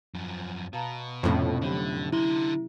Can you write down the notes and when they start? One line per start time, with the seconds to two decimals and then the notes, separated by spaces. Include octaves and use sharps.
0.15 F#2 F3
0.73 B2 F5 A5 A#5
1.23 F2 A2 C3 B3 C#4
1.62 D3 F#3 G4 B5
2.13 D3 E4 C6